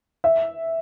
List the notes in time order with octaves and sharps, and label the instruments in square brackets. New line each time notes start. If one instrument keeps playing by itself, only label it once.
[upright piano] E5